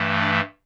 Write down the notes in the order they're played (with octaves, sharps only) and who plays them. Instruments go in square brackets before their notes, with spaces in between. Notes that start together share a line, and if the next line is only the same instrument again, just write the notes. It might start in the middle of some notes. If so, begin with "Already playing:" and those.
Already playing: [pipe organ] G2 E3 A3
D4